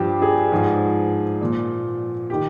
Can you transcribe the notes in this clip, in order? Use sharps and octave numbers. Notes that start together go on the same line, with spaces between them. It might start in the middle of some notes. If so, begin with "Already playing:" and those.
Already playing: G2 F3 G4
G#4
G#2 F3
A#2 F3
D#3 G4